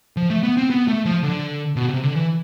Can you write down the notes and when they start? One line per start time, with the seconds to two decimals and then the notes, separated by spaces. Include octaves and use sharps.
0.17 F3
0.30 A3
0.43 B3
0.57 C4
0.70 B3
0.88 A3
1.06 F3
1.23 D3
1.76 B2
1.89 C3
2.03 D3
2.16 E3